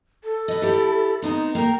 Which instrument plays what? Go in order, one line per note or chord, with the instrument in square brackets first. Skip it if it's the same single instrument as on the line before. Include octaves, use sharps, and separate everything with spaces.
[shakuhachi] A4
[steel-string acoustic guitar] B4 D#5
E4 G4
[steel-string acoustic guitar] B3 C4 [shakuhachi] D#4
[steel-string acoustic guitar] A#3 A#4 [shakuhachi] G5